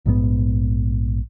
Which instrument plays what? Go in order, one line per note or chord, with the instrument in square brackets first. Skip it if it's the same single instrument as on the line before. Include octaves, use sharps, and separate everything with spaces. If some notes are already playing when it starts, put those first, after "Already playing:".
[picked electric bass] A#1 G#2 D3 B3